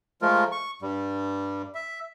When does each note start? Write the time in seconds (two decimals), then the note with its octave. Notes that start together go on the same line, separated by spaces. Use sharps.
0.22 F3 G#3 A3 F4 A#4
0.52 C#6
0.82 G2 G3
1.75 E5